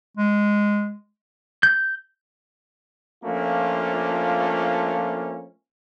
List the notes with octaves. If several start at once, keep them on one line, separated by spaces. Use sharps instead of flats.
G#3
G6
F3 A3 A#3 C#4 D4 F4